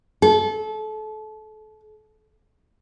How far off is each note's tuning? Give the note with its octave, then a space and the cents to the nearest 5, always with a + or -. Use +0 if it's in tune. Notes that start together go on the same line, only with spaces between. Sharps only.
A4 -30